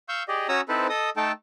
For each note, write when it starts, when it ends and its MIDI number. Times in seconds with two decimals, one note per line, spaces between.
0.09 0.23 77
0.09 0.23 85
0.09 0.23 88
0.09 0.23 91
0.28 0.47 67
0.28 0.47 68
0.28 0.47 74
0.28 0.47 75
0.49 0.61 61
0.49 0.61 66
0.49 0.61 73
0.49 0.61 82
0.49 0.61 87
0.49 0.61 88
0.69 0.87 60
0.69 0.87 63
0.69 0.87 64
0.69 0.87 69
0.69 0.87 71
0.69 0.87 72
0.89 1.10 69
0.89 1.10 75
0.89 1.10 87
1.17 1.32 57
1.17 1.32 63
1.17 1.32 69
1.17 1.32 79
1.17 1.32 81